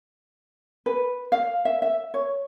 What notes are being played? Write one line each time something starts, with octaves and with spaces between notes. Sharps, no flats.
B4
F5
E5
E5
C#5